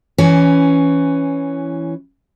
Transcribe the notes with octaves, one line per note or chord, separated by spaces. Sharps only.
E3 C#4